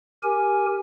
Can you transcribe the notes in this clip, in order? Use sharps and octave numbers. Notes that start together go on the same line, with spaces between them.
G4 A#4 G#5